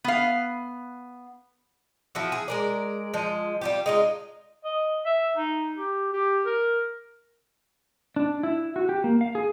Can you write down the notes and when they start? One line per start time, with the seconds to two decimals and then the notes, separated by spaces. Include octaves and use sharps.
0.04 B3 F5
2.15 F3 E4 F#4
2.32 G#4
2.48 G#3 A#4 D5
3.14 F3 G#3
3.61 G3 F4 G4
3.86 G#3 D#4 F4
4.65 D#5
5.06 E5
5.37 D#4
5.77 G4
6.13 G4
6.46 A#4
8.16 D4
8.43 E4
8.76 F#4
8.89 G4
9.04 A#3
9.21 F5
9.35 G#4